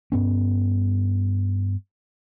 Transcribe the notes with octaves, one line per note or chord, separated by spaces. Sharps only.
G2 B3 C#4